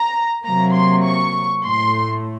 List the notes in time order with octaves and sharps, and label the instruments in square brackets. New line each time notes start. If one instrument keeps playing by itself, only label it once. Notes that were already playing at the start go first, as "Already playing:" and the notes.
Already playing: [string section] A#5
C3 F#3 A#3 A#5
C6
C#6
A2 A3 C6